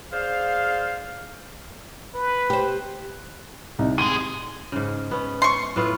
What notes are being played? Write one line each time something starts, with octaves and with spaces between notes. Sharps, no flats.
G#4 C5 D5 F5
B4
G4 C5
C2 D#4
C#2 G#3 D#7
G#2 C#3
B3 C#4
C6 C#6
A2 B3 F4